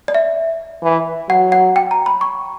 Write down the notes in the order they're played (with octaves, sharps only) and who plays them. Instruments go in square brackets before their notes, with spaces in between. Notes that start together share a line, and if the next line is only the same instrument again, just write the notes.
[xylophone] D5
E5
[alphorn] E3
[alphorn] F#3 [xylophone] F#5
[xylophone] F#5
G5
A#5
B5
C#6